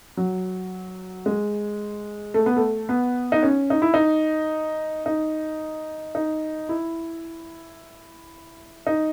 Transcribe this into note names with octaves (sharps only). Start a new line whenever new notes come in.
F#3
G#3
A3
B3
A3
B3
D#4
C#4
D#4
E4
D#4
D#4
D#4
E4
D#4